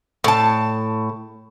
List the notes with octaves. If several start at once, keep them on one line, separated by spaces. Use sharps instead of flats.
A2 A5